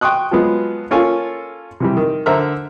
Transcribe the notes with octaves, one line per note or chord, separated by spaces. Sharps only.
G5 C6 C#6 D#6 F#6
F3 F#3 G#3 B3
A#3 C#4 F4 A4 C#5 G#5
C3 E3 G3
D#3
D3 A#4 C5 E5 A#5 F6